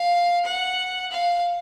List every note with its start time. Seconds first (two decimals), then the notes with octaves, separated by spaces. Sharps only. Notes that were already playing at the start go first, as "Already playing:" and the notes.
Already playing: F5
0.45 F#5
1.11 F5